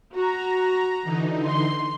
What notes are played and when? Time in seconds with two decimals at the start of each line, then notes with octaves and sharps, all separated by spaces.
0.15 F#4 A#5
1.03 D3 E3 D#4
1.46 C6